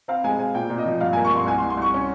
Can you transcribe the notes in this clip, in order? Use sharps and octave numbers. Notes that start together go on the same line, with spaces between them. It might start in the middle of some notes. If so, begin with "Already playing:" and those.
C4 F5
G#3 G#5
C4 G#5
A#2 G5
A#2
D#5
F3
G2 F5
G#5
A#3
C#6
G2
C6
C2 G#5
C6
C2
C6
C2 C#6
C#4